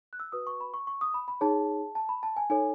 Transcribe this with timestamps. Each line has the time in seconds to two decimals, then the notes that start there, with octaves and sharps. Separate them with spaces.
0.13 F#6
0.20 E6
0.32 F#4 B4 D#6
0.47 C#6
0.60 B5
0.74 C#6
0.87 C#6
1.01 D#6
1.14 B5
1.28 B5
1.41 D#4 G#4 C#5 A5
1.95 A5
2.09 B5
2.23 A5
2.37 G#5
2.50 D#4 A4 C#5 G#5